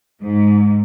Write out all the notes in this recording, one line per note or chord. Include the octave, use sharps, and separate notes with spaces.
G#2